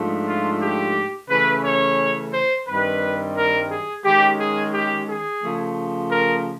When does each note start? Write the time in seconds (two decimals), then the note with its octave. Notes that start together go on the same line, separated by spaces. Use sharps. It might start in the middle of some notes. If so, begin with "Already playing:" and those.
Already playing: G#2 F3 A3 D4
0.27 F4
0.61 G4
1.30 C#3 E3 A3 C#4 B4
1.64 C#5
2.33 C5
2.67 G2 D#3 G3 C4 B4
3.36 A#4
3.71 G#4
4.05 D#3 G#3 C#4 G4
4.39 G#4
4.73 G4
5.08 G#4
5.42 C#3 F3 A3
6.11 A#4